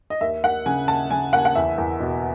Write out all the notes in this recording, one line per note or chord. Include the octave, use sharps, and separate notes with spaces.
D#5
D#2 E5
D#2 F#5
C#3 G#5
D#2 A5
C#3 G#5
D#2 F#5
F#5
E2 E5
E2
B2